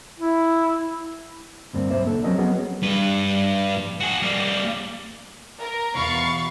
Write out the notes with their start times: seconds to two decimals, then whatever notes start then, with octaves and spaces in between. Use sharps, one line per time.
0.20 E4
1.73 D2 G2 A#3 C4
1.91 B1 A#3 C5 E5
2.07 D3 A4
2.24 F#3 C4 C#4 A#4 D#5
2.38 F#3 B3 C#4 G#4
2.82 G2 B4
4.00 F#4 G#4
4.22 G3 A#3
5.60 A#4
5.96 E2 B2 F5 B5 C#6 A6